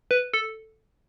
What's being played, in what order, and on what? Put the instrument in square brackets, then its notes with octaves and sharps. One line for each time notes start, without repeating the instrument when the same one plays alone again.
[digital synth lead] B4
A4